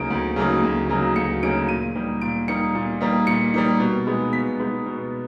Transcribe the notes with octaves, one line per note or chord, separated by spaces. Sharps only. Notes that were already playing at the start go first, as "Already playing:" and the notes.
Already playing: D2 C#3 F#3 A#3 D#4 D7
D2
C#3 F#3 A#3 D#4
D2
C#3 F#3 A#3 D#4
D2 C#7
C#3 F#3 A#3 D#4 D7
A#2 D#7
G3 A#3 D#4
A#2 D7
G3 A#3 D#4 C#7
A#2
G3 A#3 D#4
A#2 C#7
G3 A#3 D#4
B2
G#3 B3 D#4
B2 B6
G#3 B3 D#4
B2